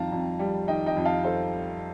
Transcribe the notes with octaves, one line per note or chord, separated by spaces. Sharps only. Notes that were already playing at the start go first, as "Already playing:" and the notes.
Already playing: F2 D#3 F5 G5 A5 A#5
F2
G3
D#3 D#5 G5
D#5 G5
F2
F5 A5
A4 C5